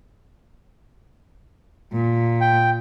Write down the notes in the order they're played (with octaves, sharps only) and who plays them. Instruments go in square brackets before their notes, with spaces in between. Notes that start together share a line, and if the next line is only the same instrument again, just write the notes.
[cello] A#2
[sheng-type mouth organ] G5